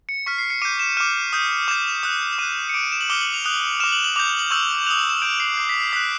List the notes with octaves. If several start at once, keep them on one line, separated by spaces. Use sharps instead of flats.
C#7
C#6 F6 B6
C7
C#7
D6 G6 D#7
E7
D6 F6 D#7
D#6 G6
D6 G6 E7
D#6 F#6
E7
D6 F#6 D#7
C#7
D6 F#6 D7
D#7
E7
F#7
D6 F6 G7
F#7
F7
D#6 F#6 F7
D6 F6 E7
F#7
F#7
D6 G6 F7
F#7
C#6 E6 G6 F#7
D#6 F#6 F7
E7
E7
C#6 E6 G6 D7
C7
D6 G6 C7
B6
C7
D#6 F#6 B6